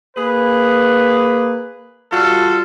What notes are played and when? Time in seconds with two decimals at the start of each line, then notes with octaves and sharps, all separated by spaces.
0.16 A#3 G#4 B4
2.12 G3 F4 F#4 A4